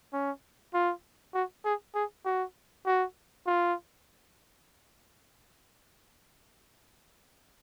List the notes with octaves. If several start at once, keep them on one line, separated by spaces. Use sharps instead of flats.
C#4
F4
F#4
G#4
G#4
F#4
F#4
F4